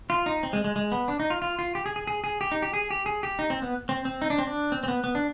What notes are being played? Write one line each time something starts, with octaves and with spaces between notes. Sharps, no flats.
F4
D#4
C4
G#3
G#3
G#3
B3
D4
D#4
F4
F4
F4
G4
G#4
G#4
G#4
G#4
G4
D#4
G4
G#4
G4
G#4
G4
D#4
C4
B3
C4
C4
D#4
D4
C4
D4
C4
C4
B3
B3
D4